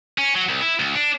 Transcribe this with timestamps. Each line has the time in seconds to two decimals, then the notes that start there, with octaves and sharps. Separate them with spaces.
0.18 C#4
0.35 F#3
0.49 C2
0.61 E4
0.80 C#2
0.95 D4